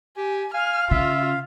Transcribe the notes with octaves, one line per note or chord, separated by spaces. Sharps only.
G4 G#5
F5 G#5 F6
C#3 F4 E5